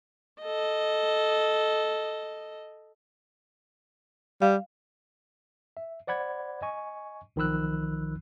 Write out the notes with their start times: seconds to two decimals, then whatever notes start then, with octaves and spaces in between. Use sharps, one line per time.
0.42 A4 D#5
4.42 G3 F5
5.77 E5
6.07 C5 D5 F#5 B5 G#6
6.62 D#5 G#5 C#6
7.36 B1 D#3 F3 B5 E6 F#6